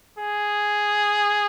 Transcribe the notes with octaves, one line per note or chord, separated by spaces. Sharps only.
G#4